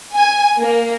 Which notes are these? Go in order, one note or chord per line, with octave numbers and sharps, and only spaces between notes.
G#5
A#3